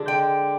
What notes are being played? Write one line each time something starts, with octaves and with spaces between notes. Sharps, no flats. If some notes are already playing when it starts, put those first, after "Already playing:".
Already playing: D3 G#3 D4
G5